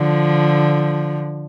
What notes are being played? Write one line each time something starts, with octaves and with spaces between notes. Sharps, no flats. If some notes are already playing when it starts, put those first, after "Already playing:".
Already playing: D3 F3